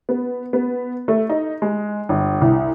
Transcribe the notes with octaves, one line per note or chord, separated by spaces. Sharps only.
B3
B3
A3
D#4
G#3
G1
C2